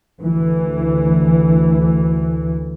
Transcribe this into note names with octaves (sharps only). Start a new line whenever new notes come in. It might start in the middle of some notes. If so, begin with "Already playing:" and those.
D2 E3